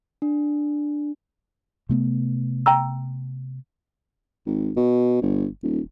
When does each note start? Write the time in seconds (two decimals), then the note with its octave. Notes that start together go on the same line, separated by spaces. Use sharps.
0.22 D4
1.89 C3 A3 B3
2.66 G5 A#5 E6
4.46 G#1
4.76 B2
5.22 G1
5.63 D#1